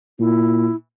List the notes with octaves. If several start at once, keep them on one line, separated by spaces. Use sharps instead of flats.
A#2 E4